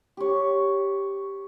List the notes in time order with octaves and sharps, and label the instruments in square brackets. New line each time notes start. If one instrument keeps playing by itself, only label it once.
[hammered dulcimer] G4 C#5